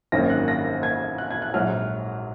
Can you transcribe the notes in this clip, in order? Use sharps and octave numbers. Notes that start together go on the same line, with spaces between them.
G#1 F#2 D#3 A#3 C#4 A#6
F#6
A#6
G#6
F#6
G#6
F#6
A#1 G#2 F#3 F6